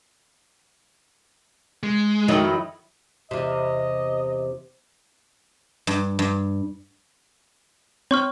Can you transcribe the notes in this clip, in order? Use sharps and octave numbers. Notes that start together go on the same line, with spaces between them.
G#3
F2 D#3 F#3 E4 D#5
E2 C3 D#5
G2
G2
C4 C#5 G5 C#6 F6